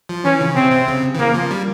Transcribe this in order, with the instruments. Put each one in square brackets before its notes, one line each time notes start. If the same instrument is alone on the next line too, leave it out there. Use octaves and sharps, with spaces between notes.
[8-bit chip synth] F3
[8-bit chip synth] E3 [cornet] C#4
[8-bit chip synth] C#3
[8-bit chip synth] C3 [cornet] C4
[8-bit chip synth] C3
C#3
E3
[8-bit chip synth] C#3 [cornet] A#3
[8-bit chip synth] F3
G3